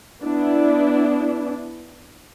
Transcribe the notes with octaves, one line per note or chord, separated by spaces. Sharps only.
B3 D4 E4